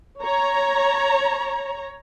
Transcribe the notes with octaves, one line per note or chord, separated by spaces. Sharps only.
C#5 A#5